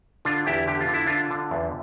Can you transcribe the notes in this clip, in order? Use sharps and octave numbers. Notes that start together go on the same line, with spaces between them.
D3 D4 F4
E2 E4 G4
D3 G4
F4
D3
E4
D3 D4 F4
D3
E2